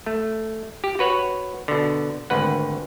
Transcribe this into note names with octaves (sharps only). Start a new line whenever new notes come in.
A3
G4
F#4 B4 C#5 F#5
B2 D3
G#1 D2 B4 F#5